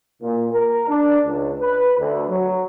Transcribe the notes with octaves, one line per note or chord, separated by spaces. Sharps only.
A#2
A#4
D4
C#2
B4
D2
F#3